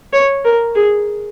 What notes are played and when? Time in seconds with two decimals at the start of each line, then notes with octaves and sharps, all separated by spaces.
0.13 C#5
0.45 A#4
0.75 G#4